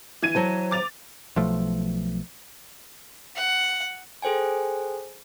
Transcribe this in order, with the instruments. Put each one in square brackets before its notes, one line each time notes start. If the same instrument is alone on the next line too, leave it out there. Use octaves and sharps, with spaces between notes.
[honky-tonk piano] E3 G#6 D#7
[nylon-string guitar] F#3 C5 A5
[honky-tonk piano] D6 A6 F7
[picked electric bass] B1 F3 A3
[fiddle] F#5
[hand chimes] G#4 A4 C5 G5 G#5